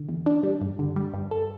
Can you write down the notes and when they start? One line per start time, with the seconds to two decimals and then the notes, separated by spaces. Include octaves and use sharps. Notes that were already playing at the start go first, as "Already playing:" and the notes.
Already playing: D3
0.09 E2
0.26 D4
0.43 G3
0.61 G2
0.79 D3
0.96 G3
1.14 G2
1.31 A4